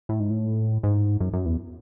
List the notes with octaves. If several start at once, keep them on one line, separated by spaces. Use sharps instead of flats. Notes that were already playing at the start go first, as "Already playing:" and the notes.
A2
G#2
A2
G#2
F#2
F#2
E2